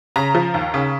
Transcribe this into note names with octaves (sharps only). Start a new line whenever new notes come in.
C#3 A#5
F3
D#2
C#3